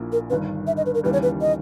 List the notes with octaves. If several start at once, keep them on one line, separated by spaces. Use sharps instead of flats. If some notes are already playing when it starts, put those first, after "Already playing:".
Already playing: A#1 A#2 A#3 E4
A#4
G1 G2 D#3 B4
E5
D#5
B4
A#4
D#2 C#3 E3 G3 B4
C#5
B4
D#5